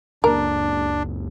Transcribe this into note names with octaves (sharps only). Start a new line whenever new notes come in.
F#1 C#2 A#3 D4 A#4